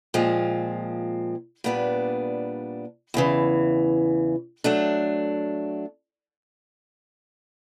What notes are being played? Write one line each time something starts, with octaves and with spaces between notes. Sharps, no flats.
A#2 F3 G#3 C4
A#2 G3 B3 D4
E2 C#3 E3
F#3 A3 D4